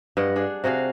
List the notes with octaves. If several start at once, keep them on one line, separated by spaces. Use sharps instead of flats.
G2 D#5 F#5
D4 G#4
C3 F#4 G#4 F5